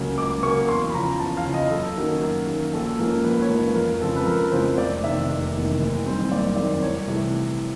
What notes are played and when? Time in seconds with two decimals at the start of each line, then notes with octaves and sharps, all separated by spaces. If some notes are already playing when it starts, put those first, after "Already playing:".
Already playing: C#2 C#3 F#3 A#3 C#4
0.18 C#2 D6
0.43 C#3 F#3 A#3 C#4 C#6
0.69 E2 C6
0.90 B5
0.94 C#3 F3 A#5
1.19 E2 A5
1.37 F5
1.45 C#3 F3
1.54 D#5
1.71 F#2 A4
1.97 D#3 F#3 A#3 C#4
2.21 F#2
2.47 D#3 F#3 A#3 C#4
2.73 A#1 A4
2.98 G#2 F3 A#3 C#4 A#4
3.24 A#1 B4
3.42 C#5
3.49 G#2 F3 A#3 C#4
3.59 B4
3.75 F2 A#4
4.01 C#3 F3 G#3 C4 A4
4.16 B4
4.26 F2 A#4
4.52 C#3 F3 G#3 C4 C5
4.78 F1 D5
5.03 E2 C3 D#3 E5
5.29 F1
5.55 E2 C3 D#3
5.80 F#1
6.06 F#2 D#3 G3 C4
6.31 F#1 D5
6.56 F#2 D#3 G3 C4 D5
6.82 C2 C#5
7.07 C3 E3 A3